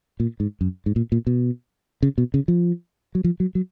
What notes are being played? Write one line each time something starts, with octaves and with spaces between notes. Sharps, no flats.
A#2
G#2
F#2
G#2
A#2
A#2
B2
C#3
B2
C#3
F3
F#3
F3
F#3
F#3